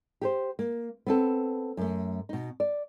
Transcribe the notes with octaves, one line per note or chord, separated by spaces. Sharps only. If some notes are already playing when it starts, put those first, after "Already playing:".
G4 G#4 C5
A#3
B3 C4 A4
F#2 A3
B2 D#4
D5